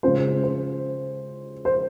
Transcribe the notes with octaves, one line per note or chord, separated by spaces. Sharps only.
C#3 G#3 C#4 F4 C5
C5
C5